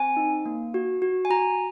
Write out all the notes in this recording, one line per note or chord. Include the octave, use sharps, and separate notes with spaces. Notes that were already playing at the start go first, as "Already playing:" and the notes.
Already playing: C4 G#5
D#4
A#3
F#4
F#4
G#5
F#4 A#5